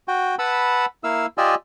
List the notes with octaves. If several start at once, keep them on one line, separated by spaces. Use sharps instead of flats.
F#4 G5
B4 F#5 A5 B5 E6
A#3 E4 F5 E6
F4 G4 D5 D#5 G#5 E6